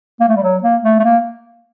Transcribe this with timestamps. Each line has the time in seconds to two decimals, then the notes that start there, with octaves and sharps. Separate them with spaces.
0.20 A#3
0.28 A3
0.36 G3
0.43 F#3
0.63 A#3
0.83 A3
0.99 A3
1.03 A#3